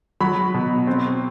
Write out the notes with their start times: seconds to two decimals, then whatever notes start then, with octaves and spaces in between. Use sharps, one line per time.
0.21 F#3 B5
0.54 B2
0.87 C4